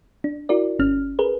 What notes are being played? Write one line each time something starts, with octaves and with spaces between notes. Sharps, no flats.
D4
E4 F#4 A#4 D5
G1 C#4 F6
G#4 A#4 B4